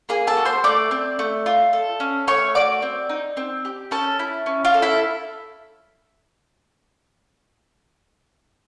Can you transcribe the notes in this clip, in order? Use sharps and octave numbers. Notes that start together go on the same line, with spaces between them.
A#3 G#4 G#5
A4 A5
F#4
C5 C6
A3 D5 D6
C4
A3
F4
A4
C#4
A3 C#5 C#6
F#4 D5 D6
C4
D#4
C4
G4
C#4 A4 A5
E4
C#4
F4 F5
A4
E4 E5